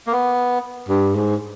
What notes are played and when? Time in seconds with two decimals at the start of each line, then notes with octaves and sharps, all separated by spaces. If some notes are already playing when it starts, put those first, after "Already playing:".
0.07 A#3
0.12 B3
0.89 G2
1.15 G#2